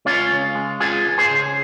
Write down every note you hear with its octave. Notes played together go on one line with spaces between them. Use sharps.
C#2 C#4 F4
C#3
G#3
C#2 F4 G#4
C#2
G#4 C5
C#3